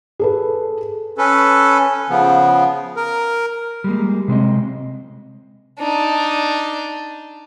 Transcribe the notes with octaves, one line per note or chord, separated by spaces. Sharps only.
G#4 A4 B4
C#4 A4 B4
C#3 F3 B3
A#4
G3 G#3 A#3
C3 G#3 C4 D#5
D4 D#4